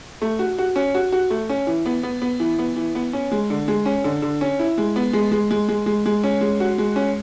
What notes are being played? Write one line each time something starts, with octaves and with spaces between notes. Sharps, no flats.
A3
F#4
F#4
C#4
F#4
F#4
A3
C#4
E3
B3
B3
B3
E3
B3
E3
B3
C#4
G#3
D3
G#3
C#4
D3
D3
C#4
E4
G#3
B3
G#3
G#3
G#3
G#3
G#3
G#3
C#4
G#3
F#4
G#3
C#4